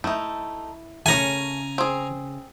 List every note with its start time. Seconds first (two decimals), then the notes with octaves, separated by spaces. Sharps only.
0.04 A3 D#4 E4
1.06 C#3 A3 A#4 C#5 G#5 A#5
1.78 C4 G#4